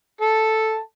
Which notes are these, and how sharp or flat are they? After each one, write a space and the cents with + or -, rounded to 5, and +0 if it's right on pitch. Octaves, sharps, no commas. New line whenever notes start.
A4 +0 A5 +0